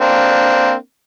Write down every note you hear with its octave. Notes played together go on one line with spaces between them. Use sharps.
A#3 C4 D4